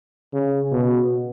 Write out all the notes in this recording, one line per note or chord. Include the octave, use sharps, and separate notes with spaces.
C#3
B2